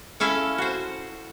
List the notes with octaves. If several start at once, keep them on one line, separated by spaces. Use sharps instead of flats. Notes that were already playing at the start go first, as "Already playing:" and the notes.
C#4 E4 A4 E5 F5
F#4 C5